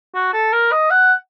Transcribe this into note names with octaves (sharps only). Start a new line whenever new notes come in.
F#4
A4
A#4
D#5
F#5